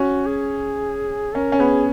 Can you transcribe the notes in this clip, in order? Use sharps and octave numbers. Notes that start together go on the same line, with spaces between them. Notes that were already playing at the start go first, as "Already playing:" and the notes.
Already playing: C#4 F#4
G#4
C#4 A#4
C#4
B3 G#4